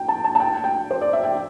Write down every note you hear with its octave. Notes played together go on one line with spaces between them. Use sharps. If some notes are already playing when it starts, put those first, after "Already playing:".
Already playing: G5
A5
A5
A5
G5
G5
C5
D5
E5
G5